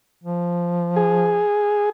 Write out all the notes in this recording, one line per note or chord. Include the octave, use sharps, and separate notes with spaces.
F3
G#4